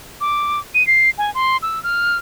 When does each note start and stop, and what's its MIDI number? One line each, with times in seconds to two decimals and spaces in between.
0.21 0.60 86
0.75 0.86 99
0.87 1.10 96
1.18 1.33 80
1.35 1.57 84
1.63 1.82 88
1.84 2.17 89